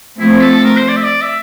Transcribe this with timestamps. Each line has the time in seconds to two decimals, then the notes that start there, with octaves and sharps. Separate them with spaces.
0.19 F3 A3 C4 E4
0.42 A4
0.64 A#4
0.77 C5
0.88 D5
0.96 E5
1.04 D5
1.22 E5